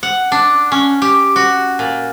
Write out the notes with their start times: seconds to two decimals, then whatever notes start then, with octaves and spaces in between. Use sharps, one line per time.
0.03 F#5
0.32 D4
0.72 C#4
1.02 G4
1.36 F#4
1.79 A#2